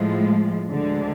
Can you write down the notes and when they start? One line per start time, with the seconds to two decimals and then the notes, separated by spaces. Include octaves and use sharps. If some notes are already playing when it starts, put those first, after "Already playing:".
Already playing: A2 F3 G#3
0.69 D2 D3 G#3